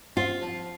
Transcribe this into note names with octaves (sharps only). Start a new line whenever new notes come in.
C4 F4
F3